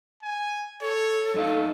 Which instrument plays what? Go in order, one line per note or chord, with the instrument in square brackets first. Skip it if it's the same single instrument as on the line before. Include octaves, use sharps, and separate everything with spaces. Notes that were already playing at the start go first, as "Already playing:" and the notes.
[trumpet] G#5
[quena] A4 [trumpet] C#5
[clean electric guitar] F#2 D#4 F5 [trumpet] A3